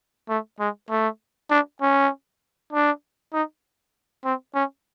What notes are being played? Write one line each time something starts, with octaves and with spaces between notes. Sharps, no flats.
A3
G#3
A3
D4
C#4
D4
D#4
C4
C#4